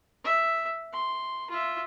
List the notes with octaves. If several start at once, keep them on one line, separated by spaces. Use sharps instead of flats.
E5
C6
F4 E5